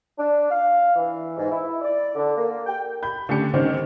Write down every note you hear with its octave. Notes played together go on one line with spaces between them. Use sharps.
D4
F5
E3
G#2
E4
D5
D3
A#3
G5
B5 G6
D3 A3 C#4 G4 C#7
D3 D#3 G3 C4 C#4 C5